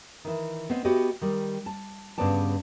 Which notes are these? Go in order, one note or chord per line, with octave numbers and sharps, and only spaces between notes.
D#3 E3
B3 C4 D#5
B3 F#4 G4 D#5
D#3 G3
A5
G2 C#3 B3 B4 D5 A5